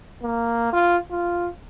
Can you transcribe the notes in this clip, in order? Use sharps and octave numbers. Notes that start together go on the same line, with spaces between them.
A#3
F4
F4